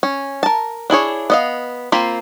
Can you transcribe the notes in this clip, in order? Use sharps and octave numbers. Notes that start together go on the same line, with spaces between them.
C#4
A#4 A5
D4 E4 G#4 C#5
B3 D#5 F5
A#3 C4 F4 B5